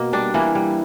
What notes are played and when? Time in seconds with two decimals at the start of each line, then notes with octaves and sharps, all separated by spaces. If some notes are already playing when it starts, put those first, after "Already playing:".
Already playing: B2 A#3
0.13 G3 D4
0.34 E3 A#3 E4
0.55 G3